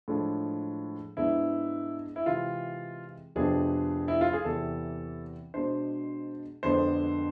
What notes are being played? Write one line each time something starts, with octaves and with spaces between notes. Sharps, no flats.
A2 F3 G#3 D4
G#2 G#3 B3 D4 E4
E4
C3 E3 G#3 F4
F2 C3 F3 B3 D4 G#4
E4
F4
G#4
E2 C3 E3 B3 A4
B2 G#3 D4 C5
F2 D3 G#3 B3 D4 C5